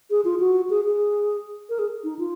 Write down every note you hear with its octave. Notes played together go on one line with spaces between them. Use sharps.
G#4
F4
F#4
G#4
G#4
A#4
G#4
D#4
F4